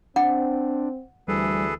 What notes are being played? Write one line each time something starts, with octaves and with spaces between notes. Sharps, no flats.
C4 D4 F#5
D2 E3 G3 G#4 A4 B4